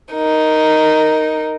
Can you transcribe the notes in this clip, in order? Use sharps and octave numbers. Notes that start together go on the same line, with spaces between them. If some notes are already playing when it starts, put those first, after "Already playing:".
D#4 A#4